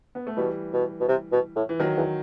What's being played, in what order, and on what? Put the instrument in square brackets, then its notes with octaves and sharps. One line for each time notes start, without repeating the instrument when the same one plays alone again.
[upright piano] B3
A3
[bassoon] B2 [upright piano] E3 G3
[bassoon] B2
B2
C3
B2
A2
[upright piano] E3
D#3 F#3
[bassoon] E2